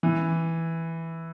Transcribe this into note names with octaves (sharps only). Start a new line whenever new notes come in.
E3